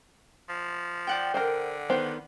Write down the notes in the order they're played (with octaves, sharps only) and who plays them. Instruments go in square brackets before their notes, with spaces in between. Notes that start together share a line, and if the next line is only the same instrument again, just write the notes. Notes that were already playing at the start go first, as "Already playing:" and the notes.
[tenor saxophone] F3
[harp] D5 F#5 G5
[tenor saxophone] D3 [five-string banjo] A#4 C5
[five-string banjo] D#3 B3 C5